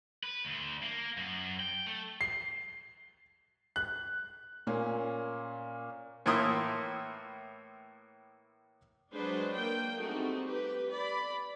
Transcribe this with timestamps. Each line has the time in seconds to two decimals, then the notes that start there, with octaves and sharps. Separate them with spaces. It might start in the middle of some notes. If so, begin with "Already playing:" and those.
0.23 B4
0.45 D2
0.83 A#3
1.17 F#2
1.60 G5
1.86 A3
2.21 C7
3.76 F#6
4.67 A#2 A#3 C#4
6.26 A2 E3 A#3 C6 D#6
9.12 F#3 G#3 D4 B4 C5
9.55 A#3 G5
9.98 G3 A3 C4 D#4 F#4 G#4
10.44 G4 B4
10.91 D5 B5